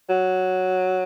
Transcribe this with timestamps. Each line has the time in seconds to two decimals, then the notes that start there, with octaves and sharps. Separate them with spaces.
0.10 F#3